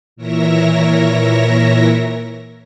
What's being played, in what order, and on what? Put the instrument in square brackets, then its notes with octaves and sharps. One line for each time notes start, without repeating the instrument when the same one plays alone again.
[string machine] A#2 E3 A#4 C#5 E5 A#6